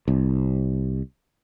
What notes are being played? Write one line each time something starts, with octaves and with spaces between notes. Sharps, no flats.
C2